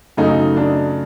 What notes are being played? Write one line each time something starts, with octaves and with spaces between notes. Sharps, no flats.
F#2 C#3 F#3 A3 D#4
D4